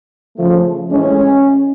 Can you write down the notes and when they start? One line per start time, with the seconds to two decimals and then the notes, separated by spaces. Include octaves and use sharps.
0.37 C#3 F3 A3
0.90 A2 E3 G#3 C#4